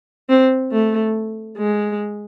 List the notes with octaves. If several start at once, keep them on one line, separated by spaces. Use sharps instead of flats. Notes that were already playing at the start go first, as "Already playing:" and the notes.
C4
A3
G#3